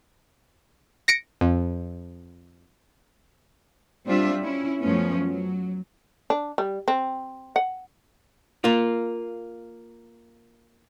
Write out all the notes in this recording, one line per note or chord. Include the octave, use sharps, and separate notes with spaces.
A#6 C#7 D7
F2
G3 C4 D4 F4 E5
C#4 E4
F#2 F3 A3 B3 C#4
F#3
D4
G3
C4
F#5
A#3 F4